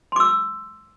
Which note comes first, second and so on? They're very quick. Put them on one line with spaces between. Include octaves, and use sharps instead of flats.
C6 D6 E6